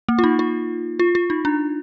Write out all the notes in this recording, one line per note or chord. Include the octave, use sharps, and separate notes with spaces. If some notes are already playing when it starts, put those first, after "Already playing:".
A#3
F4
D#4
F4
F4
F4
D#4
D4